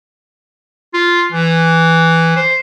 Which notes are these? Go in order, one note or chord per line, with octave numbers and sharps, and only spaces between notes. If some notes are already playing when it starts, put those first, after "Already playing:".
F4
E3
C5